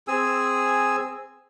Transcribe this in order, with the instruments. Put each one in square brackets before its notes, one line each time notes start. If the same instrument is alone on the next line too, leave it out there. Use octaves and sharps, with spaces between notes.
[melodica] C4 G#4 G#5 E6